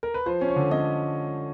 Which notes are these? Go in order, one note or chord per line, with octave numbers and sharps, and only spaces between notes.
A#4
B4
F3 C5
C#4
C#5
D3
C#4 D#5